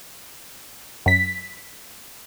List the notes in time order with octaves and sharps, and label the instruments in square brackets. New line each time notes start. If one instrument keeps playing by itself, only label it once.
[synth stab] F#2 B6